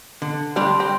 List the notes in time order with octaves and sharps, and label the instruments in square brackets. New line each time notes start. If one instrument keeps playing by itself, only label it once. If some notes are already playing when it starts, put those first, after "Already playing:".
[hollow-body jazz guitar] D3
[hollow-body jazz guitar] G3 [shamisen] C4 D4
[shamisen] C4